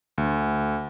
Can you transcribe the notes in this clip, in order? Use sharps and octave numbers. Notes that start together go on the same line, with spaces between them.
D2